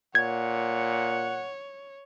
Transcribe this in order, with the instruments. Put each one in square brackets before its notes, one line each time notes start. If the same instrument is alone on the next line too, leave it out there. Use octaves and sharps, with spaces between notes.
[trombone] A#2 [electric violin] C#5 [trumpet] F#5 [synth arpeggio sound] G#6